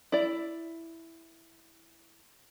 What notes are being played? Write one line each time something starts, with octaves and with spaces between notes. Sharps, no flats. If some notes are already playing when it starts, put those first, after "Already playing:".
E4 D5